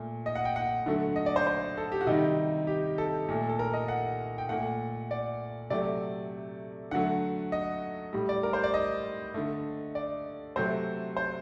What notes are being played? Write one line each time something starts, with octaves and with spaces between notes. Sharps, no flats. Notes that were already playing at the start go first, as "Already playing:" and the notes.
Already playing: A#2 A3
D#5
F#5
G5
F#5
D3 F#3 A3
D#5
D5
C5
C5
A4
G4
F#4
C3 D#3 G3 D#4
G4
A4
A#2 A3
A4
A#4
D#5
F#5
G5
A#2 A3 F#5
D5
C3 F#3 A3 D5
D3 F#3 A3 F#5
D#5
A2 G3
D5
A#4
C5
D5
D#5
D3 A3
D5
C3 F#3 A3 C5
C5